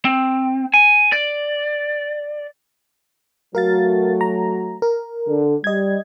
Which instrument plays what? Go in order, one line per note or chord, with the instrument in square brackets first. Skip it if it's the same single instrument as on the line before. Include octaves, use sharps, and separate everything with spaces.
[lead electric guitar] C4
G#5
D5
[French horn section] F#3 A3 F#4 [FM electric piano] A#4 F5 A6
[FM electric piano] A#5
A#4
[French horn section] D3
[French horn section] G3 [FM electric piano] D#5 G#6